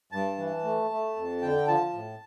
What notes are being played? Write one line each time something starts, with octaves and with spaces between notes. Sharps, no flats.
G2 A5
E3
A3
A3
F2
D3 G5
F3 A5
A2